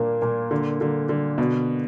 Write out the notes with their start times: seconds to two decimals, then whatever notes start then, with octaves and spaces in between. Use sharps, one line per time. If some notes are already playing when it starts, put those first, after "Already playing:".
Already playing: A#2 A#3 D4
0.22 A#2
0.51 D3
0.81 D3
1.09 D3
1.38 B2